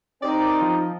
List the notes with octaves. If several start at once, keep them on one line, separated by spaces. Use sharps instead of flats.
C4 D#4 G4 A#4 D5 D#5
F3